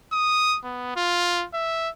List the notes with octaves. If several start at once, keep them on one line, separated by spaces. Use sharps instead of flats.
D#6
B3
F4
E5